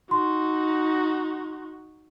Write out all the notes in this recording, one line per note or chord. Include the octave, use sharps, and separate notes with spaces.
D#4 F#4 C6